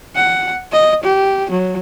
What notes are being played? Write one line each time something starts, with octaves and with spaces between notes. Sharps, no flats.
F#5
D#5
G4
F#3